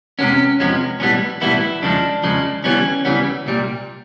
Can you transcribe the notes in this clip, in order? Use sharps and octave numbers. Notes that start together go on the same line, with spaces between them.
E2 C3 F3 G#3 B3 C#4
E2 C3 F3 G#3 B3
B1 A2 E3 G3 B3 C#4
B1 A2 E3 G3 B3 E4
E2 C#3 F3 G#3 D4
E2 C#3 F3 G#3
D2 C#3 E3 G3 B3 C#4
D2 C#3 E3 G3 B3
C2 A#2 G3